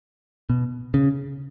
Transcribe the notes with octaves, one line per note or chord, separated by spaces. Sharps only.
B2
C#3